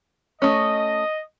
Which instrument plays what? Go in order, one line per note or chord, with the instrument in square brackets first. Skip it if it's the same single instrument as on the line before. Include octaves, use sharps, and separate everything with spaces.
[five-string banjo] A3 C#4 [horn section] D#5